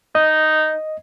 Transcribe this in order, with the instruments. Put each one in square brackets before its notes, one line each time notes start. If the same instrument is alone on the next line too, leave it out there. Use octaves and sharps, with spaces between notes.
[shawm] D#4 [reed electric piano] D#5